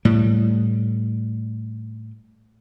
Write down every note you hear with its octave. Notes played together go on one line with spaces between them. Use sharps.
A2 G3